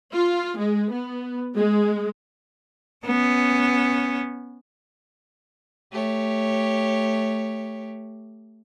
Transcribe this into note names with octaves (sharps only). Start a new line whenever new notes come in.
F4
G#3
B3
G#3
B3 C#4
A3 G4 C#5